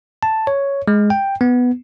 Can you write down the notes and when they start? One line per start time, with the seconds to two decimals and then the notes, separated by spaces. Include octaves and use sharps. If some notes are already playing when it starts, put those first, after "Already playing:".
0.23 A5
0.47 C#5
0.88 G#3
1.10 G5
1.41 B3